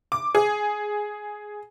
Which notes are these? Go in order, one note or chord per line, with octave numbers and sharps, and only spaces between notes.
D6
G#4